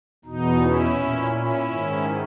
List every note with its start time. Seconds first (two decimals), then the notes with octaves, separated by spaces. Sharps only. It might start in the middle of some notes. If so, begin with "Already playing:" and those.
0.25 E2 B2 D#4
0.60 C#4 E4
0.95 A#2
1.31 C#4 E4
1.66 G#2 D#3